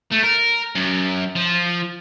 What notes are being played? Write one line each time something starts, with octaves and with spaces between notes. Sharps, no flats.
A3
A#4
F#2
F3